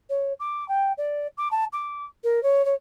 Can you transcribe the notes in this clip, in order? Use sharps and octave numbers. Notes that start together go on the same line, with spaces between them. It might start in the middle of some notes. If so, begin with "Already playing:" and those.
C#5
D6
G5
D5
D6
A5
D6
A#4
C#5
C#5